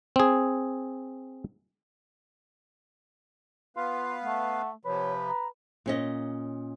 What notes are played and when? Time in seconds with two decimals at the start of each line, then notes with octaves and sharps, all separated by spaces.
0.16 C4 G#4
3.77 B3 F4 B4 F5
4.24 A3 F#5
4.85 C3 F3 B4 C#5
5.27 A#5
5.86 A#2 C#4 D#5